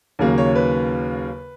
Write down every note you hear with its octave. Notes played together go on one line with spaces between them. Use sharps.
D#2 C#3 F#3 A#3
C#5
B4